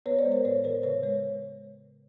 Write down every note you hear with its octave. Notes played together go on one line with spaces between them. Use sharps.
B3 B4 C#5
C5 D5
G#3
A#4 C5
A2 B4 C#5
E3 A#4 C5
C#3 B4 C#5
G#3 B4 C#5